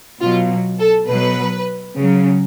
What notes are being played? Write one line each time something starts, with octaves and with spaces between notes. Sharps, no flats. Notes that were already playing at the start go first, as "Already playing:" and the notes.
B2 F#3 F4
A4
B2 B4
F#3
C#3 F#3